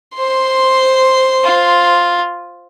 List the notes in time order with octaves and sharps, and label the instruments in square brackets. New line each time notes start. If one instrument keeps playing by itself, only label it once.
[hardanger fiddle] C5 C6
[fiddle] F4